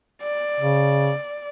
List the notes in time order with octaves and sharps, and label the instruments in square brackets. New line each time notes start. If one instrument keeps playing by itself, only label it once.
[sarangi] D5
[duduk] C#3